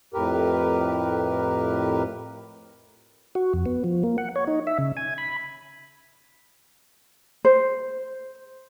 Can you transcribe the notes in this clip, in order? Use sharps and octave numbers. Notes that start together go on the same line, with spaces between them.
F2 A2 G4 A#4 B4
F#4
F2
B3
F3
A#3
F#5
C#5
D#4
E5
C#3
G#5
B5
C5